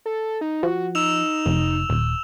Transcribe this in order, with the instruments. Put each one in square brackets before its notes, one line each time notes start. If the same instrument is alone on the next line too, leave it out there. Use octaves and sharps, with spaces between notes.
[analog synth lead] A4
D#4
[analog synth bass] F3 [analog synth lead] F#4
[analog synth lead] D#4 [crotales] E6 E7 F7
[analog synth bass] F1
D#1